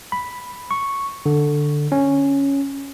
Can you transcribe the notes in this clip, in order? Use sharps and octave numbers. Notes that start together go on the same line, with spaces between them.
B5
C#6
D3
C#4